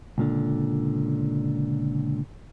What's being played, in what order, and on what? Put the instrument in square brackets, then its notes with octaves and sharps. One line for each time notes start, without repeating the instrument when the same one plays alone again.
[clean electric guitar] C#2 A#2 D3